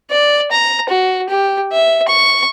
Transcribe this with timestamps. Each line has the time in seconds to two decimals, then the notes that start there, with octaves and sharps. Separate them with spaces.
0.11 D5
0.52 A#5
0.90 F#4
1.29 G4
1.73 E5
2.08 C#6